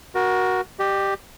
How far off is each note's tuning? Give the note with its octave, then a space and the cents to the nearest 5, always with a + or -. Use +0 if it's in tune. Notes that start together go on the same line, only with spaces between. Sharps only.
F#4 +0 A#4 +25
G4 +0 D#5 -45